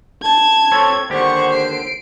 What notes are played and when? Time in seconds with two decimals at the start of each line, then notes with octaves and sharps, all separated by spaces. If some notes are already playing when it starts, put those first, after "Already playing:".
0.22 A5 G#6
0.72 C4 A4 C#5
1.10 D#2 D3 G4 C5 F#5 C#6
1.53 C7 D7